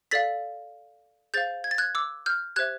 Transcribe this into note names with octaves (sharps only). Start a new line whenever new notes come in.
A4 D5 F5 A6 B6
G#4 C5 F5 G6 A6
G#6
A6
F#6 G#6
D6 E6
F6 G6
G4 C5 E5 F#6 G#6